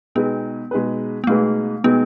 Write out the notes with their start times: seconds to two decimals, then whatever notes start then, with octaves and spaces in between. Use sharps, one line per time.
0.15 B2 G#3 B3 D#4 G#4 B4
0.71 B2 G#3 D#4 G#4 B4
1.24 B3
1.27 B2 G#3 A3 D#4 G#4 B4
1.84 B2 G#3 B3 D#4 G#4 B4